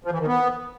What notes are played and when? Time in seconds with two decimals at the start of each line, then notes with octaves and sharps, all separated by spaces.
0.05 F3
0.12 E3
0.19 D#3
0.27 B3